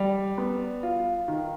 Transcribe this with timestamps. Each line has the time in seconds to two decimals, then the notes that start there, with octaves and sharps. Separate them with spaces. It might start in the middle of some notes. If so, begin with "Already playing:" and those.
Already playing: G3
0.38 B3
0.83 F4
1.28 D#3